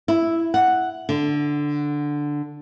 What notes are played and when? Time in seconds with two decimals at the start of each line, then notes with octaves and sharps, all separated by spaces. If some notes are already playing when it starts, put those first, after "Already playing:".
0.08 E4
0.54 F#5
1.09 D3